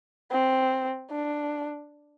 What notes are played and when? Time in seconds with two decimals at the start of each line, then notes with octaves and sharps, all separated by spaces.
0.31 C4
1.11 D4